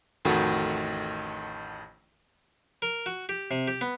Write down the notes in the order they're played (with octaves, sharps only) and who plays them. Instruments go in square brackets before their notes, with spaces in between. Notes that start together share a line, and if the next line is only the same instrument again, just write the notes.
[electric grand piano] A1 F2 D#3 A3 F#4
[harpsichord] A#4
F#4
G4
C3
G4
B3